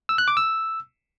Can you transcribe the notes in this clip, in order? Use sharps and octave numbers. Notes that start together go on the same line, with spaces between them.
E6
F#6
D6
E6